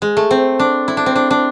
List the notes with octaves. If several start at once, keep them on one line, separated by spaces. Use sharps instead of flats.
G#3
A3
C4
D4
E4
D4
C4
D4
D4